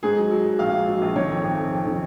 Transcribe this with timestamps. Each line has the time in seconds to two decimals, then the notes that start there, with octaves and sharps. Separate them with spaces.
0.03 G#2 G#4
0.17 F#3
0.31 F#3
0.45 F#3
0.59 A#1 F5
0.73 G#2
0.88 F#3
1.02 A#1
1.16 D#3 C#5
1.30 F2
1.44 F2
1.58 F2
1.73 F2
1.86 D#3